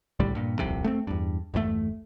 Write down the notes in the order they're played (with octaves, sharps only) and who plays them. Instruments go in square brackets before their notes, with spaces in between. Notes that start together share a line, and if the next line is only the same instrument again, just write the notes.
[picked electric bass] C2 A2 D3 G3
G2 A#2
D#1 C2 F2 C3
A3 B3 C4
E2 G2
G1 E2 D3 A3